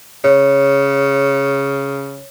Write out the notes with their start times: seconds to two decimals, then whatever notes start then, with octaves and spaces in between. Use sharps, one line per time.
0.24 C#3 C#5